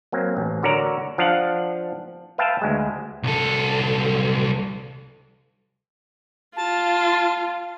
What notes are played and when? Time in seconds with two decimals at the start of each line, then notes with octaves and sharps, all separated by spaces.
0.12 F#3 A#3 C4
0.37 A1
0.63 D3 F#4 A#4 C#5 D5 A#5
1.18 F3 D4 F5 F#5
2.38 B4 E5 F5 G5 A5
2.62 D2 G#3
3.23 C2 A4
6.56 F4 A5